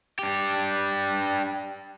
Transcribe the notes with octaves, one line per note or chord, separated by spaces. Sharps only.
D4 G4